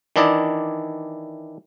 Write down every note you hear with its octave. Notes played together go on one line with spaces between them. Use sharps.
D#3 E3 D4 E4 D5 D#5